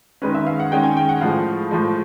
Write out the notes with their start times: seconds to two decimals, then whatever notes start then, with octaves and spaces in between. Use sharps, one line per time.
0.22 D#3 G#3 C#4 B4
0.35 E5
0.47 F5
0.60 F#5
0.71 D#3 G#3 C#4 G5
0.84 G#5
0.97 G5
1.09 F#5
1.21 A2 F3 G#3 F5
1.71 A2 F3 G#3